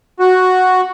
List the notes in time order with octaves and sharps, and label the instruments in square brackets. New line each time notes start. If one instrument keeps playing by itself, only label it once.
[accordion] F#4